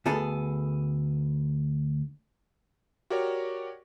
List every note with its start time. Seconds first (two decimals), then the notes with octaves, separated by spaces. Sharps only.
0.06 D2 B3 G#4 A4
3.10 F#4 G4 A#4 C#5 D5